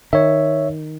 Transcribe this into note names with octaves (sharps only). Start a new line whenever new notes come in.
D#3 C#5 E5